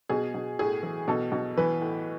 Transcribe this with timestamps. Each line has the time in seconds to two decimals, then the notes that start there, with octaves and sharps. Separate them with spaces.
0.09 B2 G#4
0.34 B2
0.59 A2 G#4
0.83 E3
1.08 B2 A4
1.32 B2
1.57 E3 B4
1.81 A2